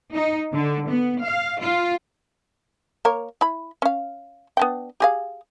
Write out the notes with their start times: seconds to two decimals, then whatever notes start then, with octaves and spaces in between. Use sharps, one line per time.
0.12 D#4
0.53 D3
0.88 B3
1.23 F5
1.60 F4
3.05 A#3 A#4 C#5
3.41 E4 B5
3.82 C#4 F5
4.57 B3 D4 G5
5.00 G4 G#4 F5